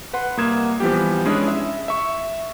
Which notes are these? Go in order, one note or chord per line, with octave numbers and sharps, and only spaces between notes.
B4 F#5 C6
C2 A#3 D#6 G#6 E7
E3 F3 G3 B3 G4
G#3 C#4 D4 E4 G#4
E5
E5 C#6